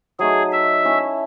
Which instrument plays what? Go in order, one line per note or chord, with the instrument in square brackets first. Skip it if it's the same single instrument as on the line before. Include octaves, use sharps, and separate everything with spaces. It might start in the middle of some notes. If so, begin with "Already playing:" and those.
[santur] F#3 A3 D#4 [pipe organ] G#4
[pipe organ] E5
[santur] A3 C#4 E4